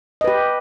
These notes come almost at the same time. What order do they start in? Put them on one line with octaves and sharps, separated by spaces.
D#5 B4 G4